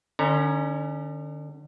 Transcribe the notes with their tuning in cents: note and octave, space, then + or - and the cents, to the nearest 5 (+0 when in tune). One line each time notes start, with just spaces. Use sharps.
D3 +40 C#4 +0 A#5 +0